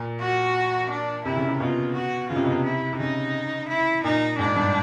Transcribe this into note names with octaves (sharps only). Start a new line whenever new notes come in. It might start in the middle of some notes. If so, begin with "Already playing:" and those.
Already playing: A#2
F#4
D4
C3 E4
C#3
C3
B2 F4
F#4
C#3 F4
C3
B2
C3
E4
C3
C#3 D#4
E4
A#2 D#4
G#2 D4
G2